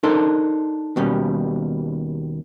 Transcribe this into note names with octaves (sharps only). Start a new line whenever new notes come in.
D4 D#4 A4 A#4 C5
D#2 B2 G3 C#4